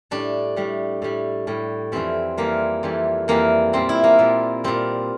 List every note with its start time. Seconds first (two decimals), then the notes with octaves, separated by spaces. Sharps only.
0.11 A2 G3 D4
0.56 A2 G3
1.02 A2 G3
1.47 A2 G3
1.92 F2 E3 G3 C4
2.37 F2 E3 G3 A#3
2.83 F2 E3 G3
3.28 F2 E3 G3 A#3
3.73 A#2 G3 C4
3.89 E4
4.04 A#3
4.19 A#2 G3
4.64 A#2 G3 C4